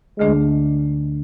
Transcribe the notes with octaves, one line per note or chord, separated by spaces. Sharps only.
D2 D3 G#3 A3 D4